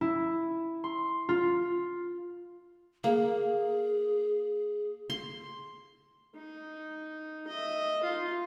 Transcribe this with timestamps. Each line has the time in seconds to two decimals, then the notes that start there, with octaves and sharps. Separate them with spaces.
0.01 E4
0.84 C6
1.29 F4
3.04 A#3 G#4
5.10 C6
6.35 D#4
7.47 D#5 E5
8.04 D#4 F4